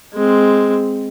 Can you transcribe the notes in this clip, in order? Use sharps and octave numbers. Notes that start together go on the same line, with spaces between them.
G#3 C4